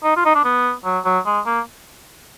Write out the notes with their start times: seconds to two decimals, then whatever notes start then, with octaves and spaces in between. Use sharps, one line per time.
0.04 D#4
0.16 F4
0.25 D#4
0.35 D4
0.44 B3
0.85 F#3
1.05 F#3
1.26 G#3
1.46 A#3